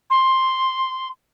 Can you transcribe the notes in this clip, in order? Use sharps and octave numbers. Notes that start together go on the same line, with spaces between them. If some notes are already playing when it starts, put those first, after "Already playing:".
C6